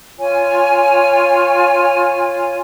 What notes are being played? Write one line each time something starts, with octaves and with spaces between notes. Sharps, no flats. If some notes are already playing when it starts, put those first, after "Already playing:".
F4 C#5 G#5